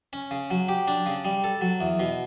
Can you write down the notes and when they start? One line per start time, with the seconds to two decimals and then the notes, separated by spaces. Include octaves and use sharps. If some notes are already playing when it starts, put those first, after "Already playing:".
0.13 C#4
0.31 C#3
0.51 F#3
0.69 G4
0.88 D4
1.06 C#3
1.25 G3
1.44 A4
1.61 F#3
1.81 E2
2.00 B2